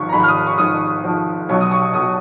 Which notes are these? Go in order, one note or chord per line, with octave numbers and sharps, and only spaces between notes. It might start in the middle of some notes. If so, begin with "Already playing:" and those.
Already playing: G#1 G#2 F3 C#6
A#5
G#1 G#2 F3 B5
F6
D#6
C#6
G#1 G#2 F3 D#6
G#1 G#2 F3
B1 B2 F#3 C#6
D#6
C#6
B1 B2 F#3 D#6